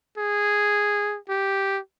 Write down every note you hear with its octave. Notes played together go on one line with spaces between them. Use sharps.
G#4
G4